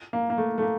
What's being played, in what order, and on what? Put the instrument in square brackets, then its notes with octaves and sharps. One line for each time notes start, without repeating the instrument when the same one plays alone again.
[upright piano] A#3
A#3
A3
A3
A#3